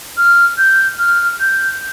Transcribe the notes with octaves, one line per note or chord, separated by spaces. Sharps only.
F6
G6
F6
G6